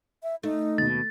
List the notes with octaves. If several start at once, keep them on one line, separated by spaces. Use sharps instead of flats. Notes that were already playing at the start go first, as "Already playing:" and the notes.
E5
A3 D#4
D#2 B2 A6